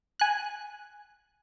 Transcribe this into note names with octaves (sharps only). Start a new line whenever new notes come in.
G#5 F#6